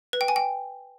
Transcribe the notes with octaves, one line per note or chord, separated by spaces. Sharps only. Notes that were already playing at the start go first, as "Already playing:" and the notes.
B4
G5
G#5
G5